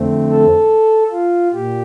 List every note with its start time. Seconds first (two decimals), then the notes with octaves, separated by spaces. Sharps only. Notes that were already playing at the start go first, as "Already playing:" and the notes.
Already playing: F2 D3 A3 C4
0.29 A4
1.11 F4
1.53 A#2 G4